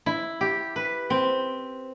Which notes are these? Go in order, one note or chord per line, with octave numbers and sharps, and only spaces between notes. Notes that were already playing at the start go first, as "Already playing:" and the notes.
E4
G4
B4
C4